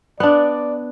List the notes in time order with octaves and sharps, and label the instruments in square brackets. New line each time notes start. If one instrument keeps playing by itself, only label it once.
[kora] B3 D4 [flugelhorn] D5